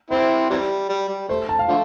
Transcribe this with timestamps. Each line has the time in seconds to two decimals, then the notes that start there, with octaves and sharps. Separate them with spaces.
0.11 C4 E4 C5
0.50 C3 E3 G3
0.89 G3
1.09 G3
1.28 A3 C5
1.49 A5
1.59 F5
1.68 D3 F3 A3